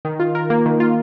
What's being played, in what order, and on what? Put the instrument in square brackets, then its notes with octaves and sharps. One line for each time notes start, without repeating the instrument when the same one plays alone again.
[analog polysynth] D#3
F4
A#4
A#3
D#3
F4